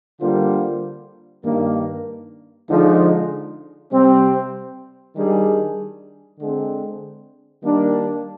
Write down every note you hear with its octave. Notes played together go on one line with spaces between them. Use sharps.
D3 G3 A#3 F4 C5
G2 D#3 A#3
D3 F3 G#3 D#4
C3 G3 C4
D#3 G3 D4 G#4
D3 G#3 C4
D#3 G3 A#3 D4